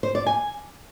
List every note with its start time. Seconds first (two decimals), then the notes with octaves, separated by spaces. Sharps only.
0.03 C5
0.15 D5
0.27 G#5